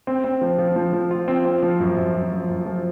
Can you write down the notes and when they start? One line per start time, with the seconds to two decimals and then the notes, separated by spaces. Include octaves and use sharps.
0.07 C4
0.24 C4
0.41 F3
0.59 F3
0.76 F3
0.93 F3
1.11 F4
1.28 C4
1.45 C4
1.62 F3
1.80 F#2
1.96 F#2
2.15 F#2
2.32 F3
2.49 F#2
2.66 F3